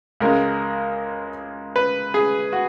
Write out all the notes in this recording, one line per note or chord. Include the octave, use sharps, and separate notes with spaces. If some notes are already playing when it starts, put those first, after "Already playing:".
C#2 C#3 G#3 A#4
B4
G#4
F#4